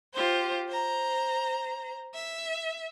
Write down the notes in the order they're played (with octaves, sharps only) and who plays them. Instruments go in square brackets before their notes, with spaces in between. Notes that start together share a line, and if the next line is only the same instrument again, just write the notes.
[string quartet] F4 G4 C5
C5 A#5
E5